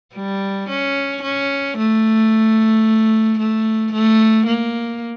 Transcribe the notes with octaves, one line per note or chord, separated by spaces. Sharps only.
G3
C#4
C#4
A3
A3
A3
A#3